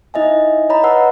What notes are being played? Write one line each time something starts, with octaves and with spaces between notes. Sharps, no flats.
D#4 E4 D#5 E5 G#5
C#5 D#5 A#5 B5
B4 F#5 A5 E6